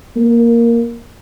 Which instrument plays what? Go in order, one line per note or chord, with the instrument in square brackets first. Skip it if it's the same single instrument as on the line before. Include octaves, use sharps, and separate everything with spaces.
[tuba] A#3